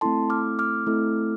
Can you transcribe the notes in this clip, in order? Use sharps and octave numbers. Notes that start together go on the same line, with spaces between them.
A3 C4 E4 A4 A5 C6
D6 F6
D6 F6
A3 C4 E4 A4